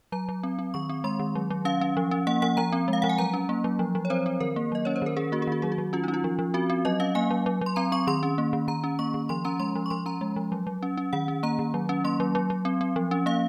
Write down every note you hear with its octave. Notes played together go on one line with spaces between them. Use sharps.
F#3 A#5
F#3
C4
C4
D#3 C#6
C4
G#3 C6
D#3
F#3
F#3
C#4 F5
C#4
F3
C#4
A#3 F#5
F3 F#5
F3 A#5
C4
G#3
F5
F3 F#5
G#5
F#3 A#5
C#4
A#3
F#3
F3
F3
C#5
C4 C5
C4
D#3 A#4
A#3
F#3 D#5
C#4 C#5
C5
D#3 A#4
C#4 G#4
A#3 F#4
G#4
D#3 F#4
F#3 G#4
F#4
F#3
C#4 F4
C#4 D#4
F4
F3
F3
C4 F#4
C4
F#3 D#5
C#4 F5
A#3 G#5
F#3
F#3
F#3 C6
C4 A#5
C4 C#6
D#3 C6
C#4
A#3
D#3
D#3 A#5
C#4
A#3 C#6
D#3
F3 C6
C#4 A#5
G#3 C6
F3
C#6
F3 C6
C#4 A#5
G#3
F3
F#3
F#3
C#4
C#4
D#3 F#5
C#4
A#3 A#5
D#3
F#3
C#4
A#3 C6
F#3
F#3
F#3
C4
C4
F3
C#4
A#3 F5